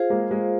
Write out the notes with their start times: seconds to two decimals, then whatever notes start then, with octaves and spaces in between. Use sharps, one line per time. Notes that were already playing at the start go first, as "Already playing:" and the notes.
Already playing: F4 G#4 C5 F5
0.10 G#3 A#3
0.30 G#3 A#3